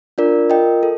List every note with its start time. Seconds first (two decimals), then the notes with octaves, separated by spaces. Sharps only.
0.18 D4 F4 A#4 D5
0.50 F4 A#4 D#5 G5
0.83 A4